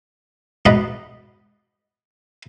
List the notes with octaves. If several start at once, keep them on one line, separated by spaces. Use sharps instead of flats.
B1 G#2 D5 D#5 F#5 B5